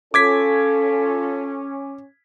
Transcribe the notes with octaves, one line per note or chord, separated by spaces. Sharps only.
C#4 F4 A4 D6 G#6 B6